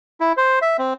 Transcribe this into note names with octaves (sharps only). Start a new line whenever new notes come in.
E4
C5
E5
C4